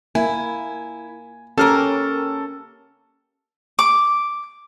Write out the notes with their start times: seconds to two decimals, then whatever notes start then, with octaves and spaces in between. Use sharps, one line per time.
0.15 A#3 E4 G#5
1.58 A#3 C#4 G4 A4 A#4 F6
3.79 D6